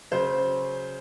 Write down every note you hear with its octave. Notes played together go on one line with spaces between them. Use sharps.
C#3 F#3 C5